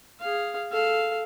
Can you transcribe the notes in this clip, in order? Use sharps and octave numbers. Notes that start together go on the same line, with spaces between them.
G#4 F5
A4 F5